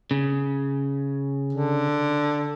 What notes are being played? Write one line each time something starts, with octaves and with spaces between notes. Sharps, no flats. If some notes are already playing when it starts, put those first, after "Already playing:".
C#3
D3